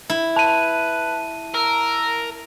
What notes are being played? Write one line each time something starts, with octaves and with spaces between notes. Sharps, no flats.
E4
B4 A5 D#7
A#4 E6